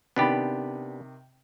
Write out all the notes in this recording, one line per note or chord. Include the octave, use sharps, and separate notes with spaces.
C3 D#3 B3 D4 G4 B5